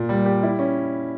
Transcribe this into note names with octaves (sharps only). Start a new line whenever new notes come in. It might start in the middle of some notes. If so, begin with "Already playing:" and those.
Already playing: A#2
G3
G4
E4
C#4